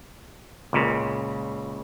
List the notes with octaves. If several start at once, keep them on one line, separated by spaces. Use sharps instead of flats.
C#2 A#2 C#3